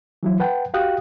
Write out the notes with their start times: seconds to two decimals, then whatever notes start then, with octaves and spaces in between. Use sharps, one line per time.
0.23 E3 F#3 E4
0.40 B4 F#5 G5 A5
0.74 F#4 G4 F5 G5 D#6 F#6